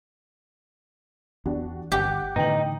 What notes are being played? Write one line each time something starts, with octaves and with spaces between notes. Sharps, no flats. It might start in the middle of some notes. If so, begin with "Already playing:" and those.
E2 D4 F#4 G4
G1 G4 F#5 D6 G6
A2 D3 E3 B3 D#4 G5 F#7